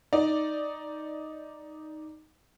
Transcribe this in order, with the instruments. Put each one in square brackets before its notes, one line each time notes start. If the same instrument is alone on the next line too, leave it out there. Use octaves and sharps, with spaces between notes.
[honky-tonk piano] D#4 D5